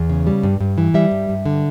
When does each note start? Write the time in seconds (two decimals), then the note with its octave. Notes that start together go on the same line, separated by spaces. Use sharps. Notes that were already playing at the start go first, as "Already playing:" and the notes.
Already playing: E2
0.09 C#3
0.27 G3
0.43 G2
0.60 G2
0.78 E3
0.94 G3 E5
1.11 G2
1.29 G2
1.46 D3